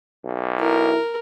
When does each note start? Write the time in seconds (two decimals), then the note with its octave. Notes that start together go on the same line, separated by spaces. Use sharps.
0.25 B1
0.60 E4 A#4